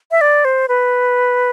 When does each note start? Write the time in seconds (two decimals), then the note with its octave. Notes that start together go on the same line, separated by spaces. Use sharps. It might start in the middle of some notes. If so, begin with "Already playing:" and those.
0.11 E5
0.21 D5
0.45 C5
0.68 B4